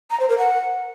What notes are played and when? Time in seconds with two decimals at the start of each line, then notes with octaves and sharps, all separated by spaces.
0.11 A#5
0.20 C5
0.29 A#4
0.38 F#5